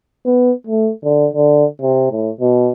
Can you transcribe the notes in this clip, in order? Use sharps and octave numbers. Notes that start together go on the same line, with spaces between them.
B3
A3
D3
D3
C3
A2
B2